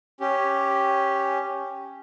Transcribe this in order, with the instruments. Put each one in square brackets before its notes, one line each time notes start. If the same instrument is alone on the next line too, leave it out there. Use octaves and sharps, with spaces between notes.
[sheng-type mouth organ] C#4 G4